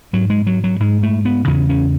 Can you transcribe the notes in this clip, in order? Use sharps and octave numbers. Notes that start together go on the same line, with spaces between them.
G#2 F#3
G#3
F#3
F#3
G#2 G#3
A3
B3
E2 C#3 C#4
C#4